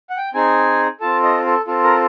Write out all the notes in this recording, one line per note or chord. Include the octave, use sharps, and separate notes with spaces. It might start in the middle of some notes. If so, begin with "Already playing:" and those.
F#5
G5
C4 D#4 G#4 G#5
C4 F4 A4 A5
D#5
A4
C4 F4 A4
A#4